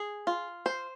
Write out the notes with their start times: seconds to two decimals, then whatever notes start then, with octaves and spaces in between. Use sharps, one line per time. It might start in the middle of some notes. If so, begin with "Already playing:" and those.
Already playing: G#4
0.27 F4
0.66 C5